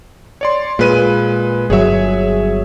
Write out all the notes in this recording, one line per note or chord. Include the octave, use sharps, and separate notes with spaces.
C#5 D5 C6
A#2 G#3 B4 D#7
G1 F#3 G#4 C#5 E5